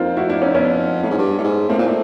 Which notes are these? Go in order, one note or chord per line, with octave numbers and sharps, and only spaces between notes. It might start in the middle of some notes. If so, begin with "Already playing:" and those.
Already playing: F2 A#3 C4 D#4 F4
E4 F#4
D4 E4
C#4 D#4
B3 C#4
A2
G#2
G2
A2
G#2
A2 A#3 C4
A#2
A2 A3